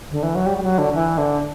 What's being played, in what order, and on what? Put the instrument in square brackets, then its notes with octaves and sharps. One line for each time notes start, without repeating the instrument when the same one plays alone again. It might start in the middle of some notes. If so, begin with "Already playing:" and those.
[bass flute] D3
E3
F#3
G3
G3
F#3
D3
E3
D3